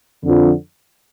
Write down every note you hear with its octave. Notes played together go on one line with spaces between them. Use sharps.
F2 D3 F3